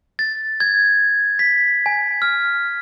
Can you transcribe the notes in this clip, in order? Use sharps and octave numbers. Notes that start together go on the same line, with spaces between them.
A6
G#6
B6
G#5
F6